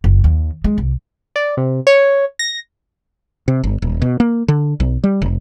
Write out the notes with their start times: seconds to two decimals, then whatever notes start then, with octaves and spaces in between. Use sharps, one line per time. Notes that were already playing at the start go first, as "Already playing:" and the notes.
0.04 F#1
0.24 D#2
0.64 G#3
0.78 C2
1.36 D5
1.57 C3
1.87 C#5
2.39 A#6
3.48 C3
3.64 G1
3.82 D#1
4.02 B2
4.20 A#3
4.48 D3
4.80 B1
5.04 G3
5.22 F1